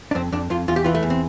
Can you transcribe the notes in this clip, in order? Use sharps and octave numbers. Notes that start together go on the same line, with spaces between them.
D4
F2 C4
F2 D4
F2 F4
E2 F4
G4
E3 F4
A3
E2
C4